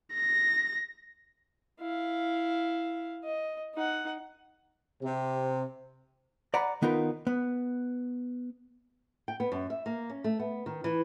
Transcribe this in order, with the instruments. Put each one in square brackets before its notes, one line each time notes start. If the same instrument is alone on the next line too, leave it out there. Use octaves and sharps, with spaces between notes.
[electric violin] A#6
[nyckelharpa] E4 F5
D#5
D#4 F#5
[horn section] C3
[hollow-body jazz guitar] D5 F#5 G#5 A#5 B5
D#3 B3 D#4 F4 A#4 B4
B3
[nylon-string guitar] G5
B3
F#2
E5
A#3
C#4
A3
B3
D#3
E3